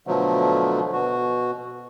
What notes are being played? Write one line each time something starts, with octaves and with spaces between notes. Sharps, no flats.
B2 D3 F3 F#3 A3
B2 F#4